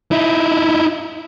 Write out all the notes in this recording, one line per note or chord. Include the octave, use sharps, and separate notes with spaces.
D#4 E4